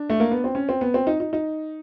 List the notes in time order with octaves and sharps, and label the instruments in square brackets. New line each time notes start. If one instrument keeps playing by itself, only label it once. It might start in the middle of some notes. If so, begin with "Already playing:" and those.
Already playing: [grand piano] D4
A3
A#3
B3
C4
C#4
C4
B3
C4
D#4
D#4
D#4